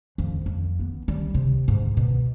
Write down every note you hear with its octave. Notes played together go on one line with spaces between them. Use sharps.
F2
F2
B3
G3
C3
G#2
B2